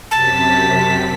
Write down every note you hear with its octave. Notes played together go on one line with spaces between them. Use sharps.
F#2 C3 A5 B6